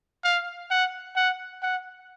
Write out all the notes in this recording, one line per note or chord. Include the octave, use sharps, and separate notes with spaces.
F5
F#5
F#5
F#5